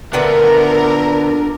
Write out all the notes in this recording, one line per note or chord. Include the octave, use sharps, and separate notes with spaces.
A#2 D3 B3 D4 A#4 E5